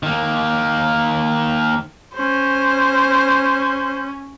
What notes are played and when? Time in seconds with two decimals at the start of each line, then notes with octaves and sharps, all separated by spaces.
0.03 D#3 A#3
2.16 C#4 C5